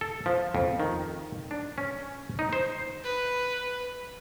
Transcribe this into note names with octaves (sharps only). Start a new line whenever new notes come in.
A4
F3
F2
D#3
D4
C#4
D#4
C5
B4